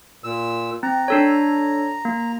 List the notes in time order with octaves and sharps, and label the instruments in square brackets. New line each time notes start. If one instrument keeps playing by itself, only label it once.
[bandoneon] A#2 E6
[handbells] C4 [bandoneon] A#5
[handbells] D4 A4 C#5
A#3